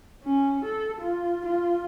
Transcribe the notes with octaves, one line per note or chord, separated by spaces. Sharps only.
C#4
A4
F4
F4